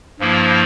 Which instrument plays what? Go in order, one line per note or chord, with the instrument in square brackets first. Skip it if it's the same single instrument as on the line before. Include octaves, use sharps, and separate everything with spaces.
[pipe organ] G2 F3 A#3 E4